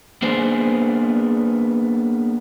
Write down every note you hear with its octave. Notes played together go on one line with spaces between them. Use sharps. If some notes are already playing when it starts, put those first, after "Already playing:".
A#3 B3 D4 G#4 C5